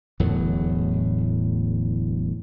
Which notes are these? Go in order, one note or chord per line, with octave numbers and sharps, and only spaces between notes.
D1 E2 A2 F#3